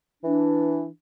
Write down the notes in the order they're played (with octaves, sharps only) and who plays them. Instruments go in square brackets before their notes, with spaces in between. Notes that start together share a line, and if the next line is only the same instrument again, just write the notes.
[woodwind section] E3 D4